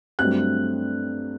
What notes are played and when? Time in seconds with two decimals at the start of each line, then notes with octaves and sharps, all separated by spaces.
0.19 G2 F#3 A3 C4 F#6